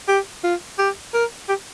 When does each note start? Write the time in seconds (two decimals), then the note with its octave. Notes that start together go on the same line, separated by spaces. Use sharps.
0.08 G4
0.44 F4
0.79 G4
1.14 A#4
1.49 G4